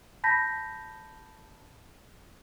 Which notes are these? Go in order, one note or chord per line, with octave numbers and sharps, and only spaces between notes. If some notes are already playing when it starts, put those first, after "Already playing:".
A5 B5 G6 A#6 B6